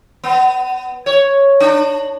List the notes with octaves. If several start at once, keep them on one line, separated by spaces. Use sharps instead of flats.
B3
C#5
D4